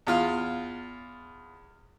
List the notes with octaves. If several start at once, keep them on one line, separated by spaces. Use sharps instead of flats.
E2 F4 F6